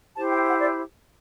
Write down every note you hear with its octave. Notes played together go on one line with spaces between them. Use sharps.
E4 G4 C5 A5
G5
F#5
D5